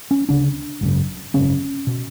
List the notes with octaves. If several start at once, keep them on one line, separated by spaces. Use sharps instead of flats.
C#4
D2 C#3 D4
G#1 F#2 C#3
G#1 F#2 C#3 C#4
B2